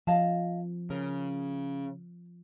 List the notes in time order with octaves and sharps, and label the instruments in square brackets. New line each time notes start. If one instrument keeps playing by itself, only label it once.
[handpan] F3 [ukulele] D#5 F5 A5
[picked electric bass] C#3 [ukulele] A#4